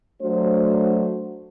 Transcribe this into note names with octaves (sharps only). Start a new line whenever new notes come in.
F#3 A3 D4 F#4 C5